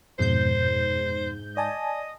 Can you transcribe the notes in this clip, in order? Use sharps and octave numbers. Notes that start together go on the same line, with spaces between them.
F2 G#2 B2 C5 G6
D5 D#5 G#5 A5